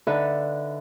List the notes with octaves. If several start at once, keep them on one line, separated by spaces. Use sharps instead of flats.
D3 D#4 A4 B4 E5 E6